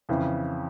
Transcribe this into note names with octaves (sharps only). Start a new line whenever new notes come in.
F2 C#3 E3